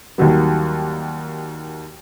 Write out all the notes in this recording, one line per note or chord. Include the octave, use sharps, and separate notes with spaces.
D#2 D#3 F#3 G3